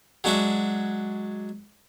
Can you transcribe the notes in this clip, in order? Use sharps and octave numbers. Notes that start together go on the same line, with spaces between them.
F#3 G#3 D4 F#4 E5